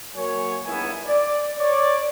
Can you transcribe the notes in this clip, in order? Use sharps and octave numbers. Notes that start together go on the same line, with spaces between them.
F#3 A#3 C#5 G#5
C#2 G2 D#3 B3 E4 G#5
D5
C#5 D5